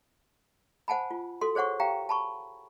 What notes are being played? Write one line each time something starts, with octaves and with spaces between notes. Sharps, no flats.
C5 F#5 G#5 A5 B5
F4
F#4 A4 C6
G#4 C5 C#5 F#5 C#6
G4 F5 G5 A#5
A5 B5 C#6